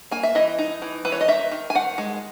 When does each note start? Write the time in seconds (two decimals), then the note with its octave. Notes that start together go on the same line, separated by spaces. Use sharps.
0.11 A#3 G#5
0.23 E5
0.35 E3 D#5
0.59 D#4
0.82 E3
1.05 E3 B4
1.12 C#5
1.21 D#5
1.28 D#3 E5
1.51 D#3
1.70 G#5
1.75 D#3 F#5
1.98 G#3